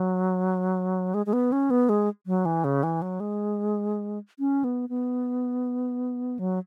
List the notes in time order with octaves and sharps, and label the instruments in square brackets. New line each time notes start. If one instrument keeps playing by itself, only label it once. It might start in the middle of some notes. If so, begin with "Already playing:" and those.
Already playing: [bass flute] F#3
G#3
G#3
B3
C#4
B3
G#3
F#3
E3
C#3
E3
F#3
G#3
C#4
B3
B3
F#3